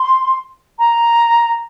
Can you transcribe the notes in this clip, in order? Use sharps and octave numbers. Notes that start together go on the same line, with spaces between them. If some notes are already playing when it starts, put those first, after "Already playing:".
Already playing: C6
A#5